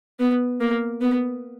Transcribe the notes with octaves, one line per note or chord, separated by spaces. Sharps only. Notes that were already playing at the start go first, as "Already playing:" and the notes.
B3
A#3
B3